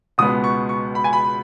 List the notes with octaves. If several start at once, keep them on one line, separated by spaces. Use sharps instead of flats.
C#2 B2 G#3 B3 D#6
C#6
C#6
B5
G#5
B5